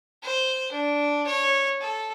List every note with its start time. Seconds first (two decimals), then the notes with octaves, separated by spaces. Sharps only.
0.23 C5
0.72 D4
1.26 C#5
1.80 A4